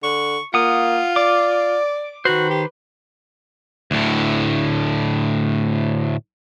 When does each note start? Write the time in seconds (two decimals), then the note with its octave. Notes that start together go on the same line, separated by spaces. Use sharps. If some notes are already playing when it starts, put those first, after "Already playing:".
0.03 D3 C#6
0.54 A#3 F4 F#5 D#6
1.16 D5 D6
2.25 D#3 F#4 B4 C5
2.50 G4
3.91 D2 A2